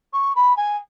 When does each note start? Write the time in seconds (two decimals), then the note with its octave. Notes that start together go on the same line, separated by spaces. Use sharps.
0.13 C#6
0.36 B5
0.57 G#5